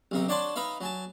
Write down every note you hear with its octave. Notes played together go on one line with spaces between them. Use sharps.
B1 C3 D#4
D4 C#5 D5 F#5 A5 C6
D#4 B4 E5 F5
F#3 G#5 A5